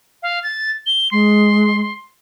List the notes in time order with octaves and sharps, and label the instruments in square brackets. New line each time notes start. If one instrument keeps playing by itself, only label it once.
[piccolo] F5
A6
G7
[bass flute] G#3 [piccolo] C6